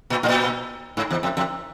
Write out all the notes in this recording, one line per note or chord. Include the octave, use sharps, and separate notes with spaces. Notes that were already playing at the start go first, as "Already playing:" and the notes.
A#2
A2
A#2
G#2
E2
F2
F2